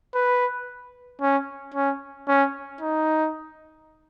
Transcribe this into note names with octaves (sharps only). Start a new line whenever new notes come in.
B4
C#4
C#4
C#4
D#4